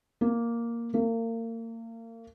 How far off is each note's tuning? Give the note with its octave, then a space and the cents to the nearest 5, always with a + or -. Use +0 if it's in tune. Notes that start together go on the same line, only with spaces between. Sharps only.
A#3 +0
A#3 -35